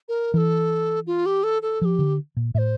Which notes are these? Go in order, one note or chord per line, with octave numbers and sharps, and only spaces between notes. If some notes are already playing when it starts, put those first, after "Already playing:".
A#4
E3 A4 A#4
F4
G4
A4
A4
F3 G4 A4
D3
A#2
A2 C5 E5